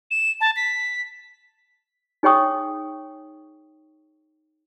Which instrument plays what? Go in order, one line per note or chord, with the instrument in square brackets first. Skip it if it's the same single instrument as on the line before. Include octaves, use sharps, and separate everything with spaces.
[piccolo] E7
A5
B6
[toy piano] D#4 G#4 C#5 G5 C#6 D#6